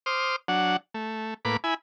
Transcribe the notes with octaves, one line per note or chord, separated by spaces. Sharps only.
C5 C6 D6 D#6 F6
F#3 D4 F#5
A3
A2 A#3 B4 B5 D6
E4 G#5 B5